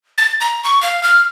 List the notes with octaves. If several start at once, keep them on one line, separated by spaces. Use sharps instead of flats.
A6
A#5
C#6
F5
F6